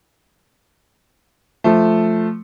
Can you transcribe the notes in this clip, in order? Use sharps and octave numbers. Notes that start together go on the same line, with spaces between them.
F3 A3